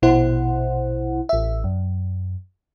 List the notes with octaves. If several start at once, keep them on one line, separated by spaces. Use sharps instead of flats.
A#1 B2 E4 C5 F#5
A1 E5
F#2